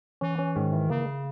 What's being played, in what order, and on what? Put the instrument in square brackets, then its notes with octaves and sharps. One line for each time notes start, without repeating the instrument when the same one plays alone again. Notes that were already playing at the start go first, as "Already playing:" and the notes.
[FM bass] E3 [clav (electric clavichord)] C#4
[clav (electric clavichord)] C#4
[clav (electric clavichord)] G#2 [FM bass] D#3
[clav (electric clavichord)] E3
[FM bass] C#3 [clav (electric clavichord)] A#3